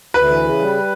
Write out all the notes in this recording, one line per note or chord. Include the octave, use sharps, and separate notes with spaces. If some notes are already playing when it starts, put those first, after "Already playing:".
D2 B4
E3
C#3
G3